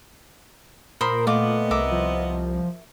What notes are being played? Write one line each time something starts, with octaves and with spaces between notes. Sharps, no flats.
A#2 A#4 C5 B5 D#6
A3 B3 F4 D#5 D6
C2 A#4 E5 D6
F3